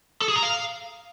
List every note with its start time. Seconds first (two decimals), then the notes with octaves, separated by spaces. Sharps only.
0.22 A4
0.29 G#4
0.36 A#5
0.43 F5